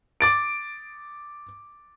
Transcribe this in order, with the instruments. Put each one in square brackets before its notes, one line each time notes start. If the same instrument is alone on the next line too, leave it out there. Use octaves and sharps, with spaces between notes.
[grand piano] D6 A6 D7